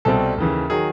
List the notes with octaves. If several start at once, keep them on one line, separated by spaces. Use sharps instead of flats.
C2 B2 G3 C4 A4
D#2 C#3 E3
D#3 F#3 G#4